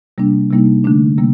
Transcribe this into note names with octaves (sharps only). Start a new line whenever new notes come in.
C3 G3 A#3 D4
C3 G3 A#3 D#4
D3 A3 D4
C3 G3 A#3